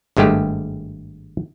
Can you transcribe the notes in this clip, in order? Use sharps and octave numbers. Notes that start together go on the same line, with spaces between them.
G#1 G2 G#3 A3 G4